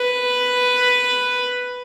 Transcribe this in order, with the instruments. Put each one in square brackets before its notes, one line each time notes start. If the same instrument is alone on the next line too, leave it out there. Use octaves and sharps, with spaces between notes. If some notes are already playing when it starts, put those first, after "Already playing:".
Already playing: [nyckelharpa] B4